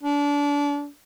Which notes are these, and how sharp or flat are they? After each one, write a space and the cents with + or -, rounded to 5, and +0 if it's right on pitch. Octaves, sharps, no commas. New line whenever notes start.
D4 -30